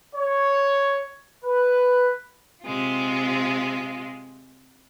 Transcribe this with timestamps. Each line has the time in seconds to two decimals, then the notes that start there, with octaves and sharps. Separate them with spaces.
0.15 C#5
1.45 B4
2.65 C3 G#3 F4